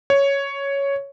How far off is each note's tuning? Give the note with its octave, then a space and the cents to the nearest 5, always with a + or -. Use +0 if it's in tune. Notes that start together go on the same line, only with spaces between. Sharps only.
C#5 +5